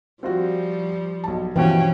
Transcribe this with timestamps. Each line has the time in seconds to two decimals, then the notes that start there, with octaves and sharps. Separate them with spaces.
0.23 F3 G3 C4 F4 F#4
1.24 B1 A5
1.56 G2 B2 E3 F3 C#4 G5